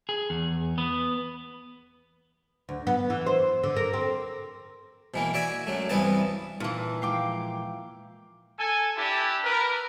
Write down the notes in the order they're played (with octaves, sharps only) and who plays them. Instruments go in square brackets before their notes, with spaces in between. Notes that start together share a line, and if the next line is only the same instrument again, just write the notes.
[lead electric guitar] G#4
E2
B3
[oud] D2
B3
E3
C5
D3
A#4
C4
[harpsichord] B2 E3 A#3
F#4 D5 E5 G#5
F#2 F#3 A3
C2 G2 E3 B3 D#5 A5
[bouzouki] A#2 E3 [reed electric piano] D#4 F4 A5
[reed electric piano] F3 G#3 F4 [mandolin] F5 G5 D6
[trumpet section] A4 G#5
D4 E4 G4 A5
A#4 B4